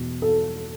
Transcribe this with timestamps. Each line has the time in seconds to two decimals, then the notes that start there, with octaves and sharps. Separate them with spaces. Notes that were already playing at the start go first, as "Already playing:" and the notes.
Already playing: E2 B2
0.22 A4